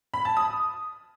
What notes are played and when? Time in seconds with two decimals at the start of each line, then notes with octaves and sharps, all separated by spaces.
0.14 B5
0.25 A5
0.37 D#6